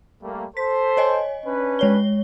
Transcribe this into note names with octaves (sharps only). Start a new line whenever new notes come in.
G3 A3 A#3
A4 C5 B6
C#5 D#5 G#5
C#4 D4 B4
G#3 C#5 G7